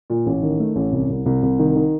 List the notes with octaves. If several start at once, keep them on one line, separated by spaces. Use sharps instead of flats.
A#2
A1
D#3
A3
A1
C2
C2
C2
C2
D#3
D#3